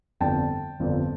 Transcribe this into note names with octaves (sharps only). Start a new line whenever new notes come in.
G1 F2 D3 G5 A5
G1 F2 D3